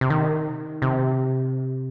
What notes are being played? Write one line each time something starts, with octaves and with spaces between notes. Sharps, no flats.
C3
D#3
C3